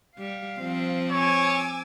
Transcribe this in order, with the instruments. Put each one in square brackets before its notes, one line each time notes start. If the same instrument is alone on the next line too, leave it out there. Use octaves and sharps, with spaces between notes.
[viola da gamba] G3 [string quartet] F5
[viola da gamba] F3 C4
[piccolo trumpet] C#5 [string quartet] G#5 D6 E6